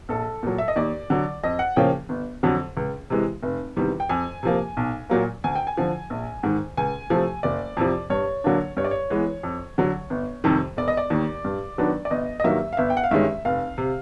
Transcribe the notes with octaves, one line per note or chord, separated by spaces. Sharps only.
A#1 A4
A#2 F#3
E5
D#5
D#2 D5
D3 F#3
F2 D#5
F#5
C#3 F3 A#3 C#4 G5
G1
F2 D3 F#3
C#2
C3 E3 G#3
F1
E2 C3 D#3 G3
G5
F2 G#5
C3 F3 A#3
B1
A#2 F#3 A#3
D2 G#5
G5
G#5
D3 F3
A#1
G#2 D#3
C#2 G#5
C3 F3 A3
F#1 D5
F2 C3 F3
G2 C#5
D3 F#3 A#3 D4
G2 C#5
D5
C#5
E3 G#3 B3
F2
D3 F#3
G1
F2 C3 D#3 G3
E1 D5
D#5
D5
D#2 D#3
G2
D#3 F#3 B3 D4
D5
G1 D#5
D#5
G2 D#3 F#3 A#3 E5
F5
G1 E5
G5
F#5
F5
G2 D#3 G#3 C#4 E5
F1 F5
C3